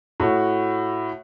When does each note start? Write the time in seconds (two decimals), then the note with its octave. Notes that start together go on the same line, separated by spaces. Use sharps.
0.20 A2 F#4